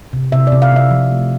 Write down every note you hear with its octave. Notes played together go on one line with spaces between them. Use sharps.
C3
C3 E5
D5
C3
F5
C3 E5
F3
A3